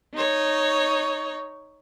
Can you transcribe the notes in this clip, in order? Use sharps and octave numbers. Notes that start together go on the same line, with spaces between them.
D#4 C#5